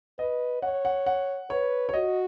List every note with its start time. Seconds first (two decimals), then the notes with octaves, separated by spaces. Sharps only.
0.19 B4 D#5
0.62 C#5 F#5
0.85 F#5
1.06 F#5
1.50 B4 C#5
1.89 C#5
1.94 F#4 D#5